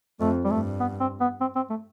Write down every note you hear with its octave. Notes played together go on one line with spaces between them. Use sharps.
F2 A3
G3
G2 A3
B3
C4
B3
C4
C4
A3